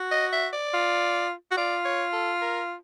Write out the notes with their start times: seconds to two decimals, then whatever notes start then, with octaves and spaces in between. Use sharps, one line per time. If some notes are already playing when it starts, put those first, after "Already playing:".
Already playing: F#4
0.11 D#5
0.33 E5
0.53 D5
0.74 F4
1.51 F#4
1.57 F4 D5
1.85 C#5
2.13 A4
2.41 A#4